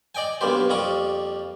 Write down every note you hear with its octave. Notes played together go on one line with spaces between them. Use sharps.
D5 D#5 G5 G#5
B1 G2 A#3 B3 G4 C5
F2 G3 A#3 C#6 D#6